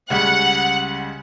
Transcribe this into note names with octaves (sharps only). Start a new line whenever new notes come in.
C#2 C#3 G3 F#5